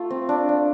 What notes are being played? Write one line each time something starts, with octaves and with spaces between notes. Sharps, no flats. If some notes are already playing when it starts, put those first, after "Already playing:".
Already playing: A3 F4
C4
D4
D4